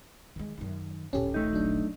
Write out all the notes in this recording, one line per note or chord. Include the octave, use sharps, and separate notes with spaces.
D#3 G#3
F#2 D#3
D#1 A#1 C#4 G4 A4
A3 D#4
F#3 D4